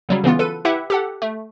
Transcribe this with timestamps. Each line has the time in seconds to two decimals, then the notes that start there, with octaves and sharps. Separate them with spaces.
0.09 C#3 F#3 G3
0.24 C#3 E3 B3 F4
0.39 A4 B4 D#7
0.65 E4 G4 B4 E5 F#5
0.90 G4 A4 F#5
1.22 A3